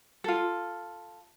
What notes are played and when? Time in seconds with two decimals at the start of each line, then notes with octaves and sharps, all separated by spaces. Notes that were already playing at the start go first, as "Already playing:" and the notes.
0.24 F4 A4